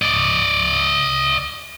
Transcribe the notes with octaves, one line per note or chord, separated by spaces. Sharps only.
D5 D#5